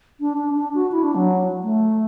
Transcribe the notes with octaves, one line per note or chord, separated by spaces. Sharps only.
D4
D4
D4
F#4
E4
D4
F#3
A3